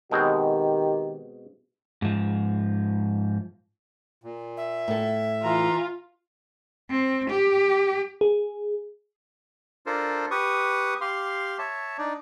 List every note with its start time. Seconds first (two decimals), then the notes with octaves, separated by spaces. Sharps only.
0.11 B2 D#3 G#3 C4 G4
2.02 G#2 F3
4.24 A#2
4.57 E5
4.88 A2 A4
5.43 E3 F4 A#5
6.90 C4
7.30 G4
8.21 G#4
9.86 D4 F4 A4 A#4 C5
10.31 G4 B4 C#6 D#6
11.01 G4 F5 C6
11.59 C#5 E5 A5
11.98 D4 D#4 D5